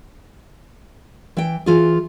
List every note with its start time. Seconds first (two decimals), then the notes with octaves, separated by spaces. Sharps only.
1.37 E3 G5
1.66 E3 F4 G#4